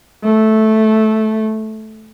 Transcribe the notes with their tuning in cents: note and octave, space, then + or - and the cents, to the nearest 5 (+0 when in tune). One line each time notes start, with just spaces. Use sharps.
A3 -10